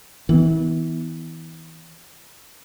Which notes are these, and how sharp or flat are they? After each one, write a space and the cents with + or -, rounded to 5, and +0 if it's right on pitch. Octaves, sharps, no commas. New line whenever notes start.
E3 -30 B3 +0